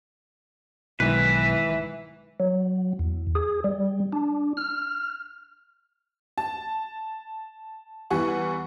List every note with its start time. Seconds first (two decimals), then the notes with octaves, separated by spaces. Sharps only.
1.00 B1 G#2 D#3 E3 B4
2.40 F#3
2.99 E2
3.35 G#4
3.64 G3
4.13 D4
4.57 F6
6.38 A5
8.10 E2 E3 G3 F#5 G#5 C#6